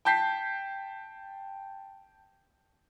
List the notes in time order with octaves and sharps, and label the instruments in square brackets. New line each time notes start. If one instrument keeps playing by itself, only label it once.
[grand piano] G5 A5 G6 B6 C7